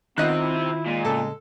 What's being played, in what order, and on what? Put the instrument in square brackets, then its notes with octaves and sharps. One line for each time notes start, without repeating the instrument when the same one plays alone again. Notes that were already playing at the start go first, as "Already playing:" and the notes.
[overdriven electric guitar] C3 C4 [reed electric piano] D#3 F4 [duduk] B3 [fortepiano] D#5 F#6
[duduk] E4
[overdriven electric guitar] A#2 [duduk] G#3
[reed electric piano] A2 C#3 [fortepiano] A4